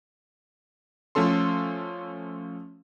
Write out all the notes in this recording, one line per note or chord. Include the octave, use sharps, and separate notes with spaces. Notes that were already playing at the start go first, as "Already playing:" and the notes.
F3 A3 C#4 A4 C6